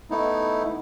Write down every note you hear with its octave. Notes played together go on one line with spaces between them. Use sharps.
A3 B3 D#4 E4